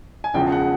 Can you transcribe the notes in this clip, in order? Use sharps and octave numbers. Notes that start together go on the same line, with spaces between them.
G#5
E1 E2 C#3 F3 G5
F#5